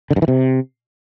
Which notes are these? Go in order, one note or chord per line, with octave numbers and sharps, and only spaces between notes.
D3
G2
E3
C3